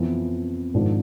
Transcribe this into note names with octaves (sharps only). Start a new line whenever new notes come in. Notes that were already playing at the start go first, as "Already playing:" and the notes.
Already playing: F2 E3 B3
G#1 G#2 F3 G#3 D4